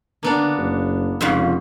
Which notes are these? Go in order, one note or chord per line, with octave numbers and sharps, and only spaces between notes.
D3 A#3 B3 D4
F#1
F1 F2 G#2 C#3